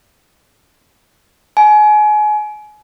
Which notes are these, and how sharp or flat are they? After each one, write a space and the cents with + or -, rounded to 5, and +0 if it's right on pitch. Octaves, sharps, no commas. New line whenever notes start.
G#5 +30